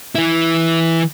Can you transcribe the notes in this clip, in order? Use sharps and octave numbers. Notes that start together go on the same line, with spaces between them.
E3 E4